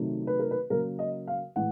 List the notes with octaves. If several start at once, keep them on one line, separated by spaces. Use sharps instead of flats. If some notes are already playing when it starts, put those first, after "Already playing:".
Already playing: C3 D#3 F#3 A3
B4
A#4
B4
C#3 F#3 A#3 A#4
D#5
F5
A2 E3 G#3 F#5